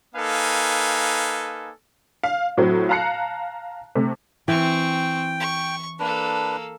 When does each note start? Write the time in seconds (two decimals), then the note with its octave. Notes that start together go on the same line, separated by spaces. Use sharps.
0.16 A#3 D#4 A4 B4 F5 G#5
2.23 F5
2.57 A2 F#3 C4
2.89 F5 A5 A#5 F#6 C7 C#7
3.95 C3 A3
4.48 E3 C4 G5 C#6
5.40 C#6
5.99 A#3 D4 A4 B4